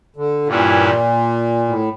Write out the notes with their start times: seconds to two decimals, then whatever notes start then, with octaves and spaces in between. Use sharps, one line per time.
0.16 D3
0.46 G2 A#2 E3 G3 C#4 E4
1.68 A2